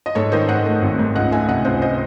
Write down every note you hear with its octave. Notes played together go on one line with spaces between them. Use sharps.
D#5
G#2 A4 C#5
D#3 C5 D#5
G#2 D#5 F#5
A3
G#1
G#2
C#2 D#5 F#5
A3 E5 G#5
C3 D#5 F#5
C#2 C5 D#5
C5 D#5